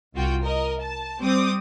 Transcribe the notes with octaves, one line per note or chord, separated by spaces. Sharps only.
C2 F4 F#4 G5
A#4 D#5
A5
G3 C4 D6 D#6